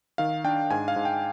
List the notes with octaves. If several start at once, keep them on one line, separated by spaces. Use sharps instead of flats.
D#3 F5
D4 G5
G#2 G#5
F5
G#2
G5